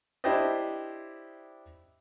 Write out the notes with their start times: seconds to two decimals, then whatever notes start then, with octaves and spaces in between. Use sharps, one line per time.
0.24 D4 E4 G4 C5 D5 D#5